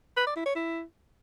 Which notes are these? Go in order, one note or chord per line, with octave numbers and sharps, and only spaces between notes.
B4
D5
E4
C#5
E4